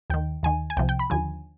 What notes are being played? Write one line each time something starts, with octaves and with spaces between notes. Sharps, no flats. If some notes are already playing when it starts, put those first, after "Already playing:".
D#2 D#3 G5
D#2 D#3 G#5
G#5
C2 C3 F3 G5
G5
B5
D#2 D3 F3 G#5